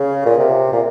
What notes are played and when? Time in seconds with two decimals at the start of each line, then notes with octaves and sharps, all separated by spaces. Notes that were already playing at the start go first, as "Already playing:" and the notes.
Already playing: C#3
0.26 A#2
0.38 C3
0.73 A#2